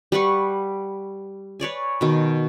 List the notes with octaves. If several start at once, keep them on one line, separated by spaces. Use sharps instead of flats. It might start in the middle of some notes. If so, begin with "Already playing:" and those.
G3 B4 F#5 C#6
B4 C#5 D5 G#5
B2 D#3